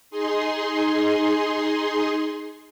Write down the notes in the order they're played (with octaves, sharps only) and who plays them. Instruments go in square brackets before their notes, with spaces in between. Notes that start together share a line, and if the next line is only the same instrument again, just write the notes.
[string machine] D#4 G#4 C6